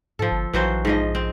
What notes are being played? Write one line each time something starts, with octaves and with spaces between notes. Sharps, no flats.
G#2 F3 A4
G1
A#1 E3 F#3 C5
G#2 F3 D#5
C4